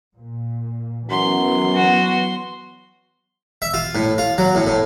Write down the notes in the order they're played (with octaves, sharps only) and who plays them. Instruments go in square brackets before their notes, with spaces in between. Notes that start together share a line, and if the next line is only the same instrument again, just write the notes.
[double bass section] A#2
[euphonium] F#2 [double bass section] E3 F#3 B3 [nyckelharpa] C6
[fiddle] F#4
[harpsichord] E5
F4
A2
F4
F#3
A2
A2